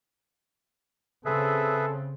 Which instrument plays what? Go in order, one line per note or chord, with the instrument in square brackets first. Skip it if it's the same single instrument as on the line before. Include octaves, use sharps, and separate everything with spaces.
[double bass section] C#3 C4 [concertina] G#4 B4 E5 [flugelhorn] A4